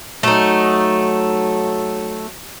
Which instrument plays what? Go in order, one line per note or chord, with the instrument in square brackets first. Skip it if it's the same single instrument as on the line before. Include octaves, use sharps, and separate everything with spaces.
[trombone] F#3 [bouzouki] A3 D#4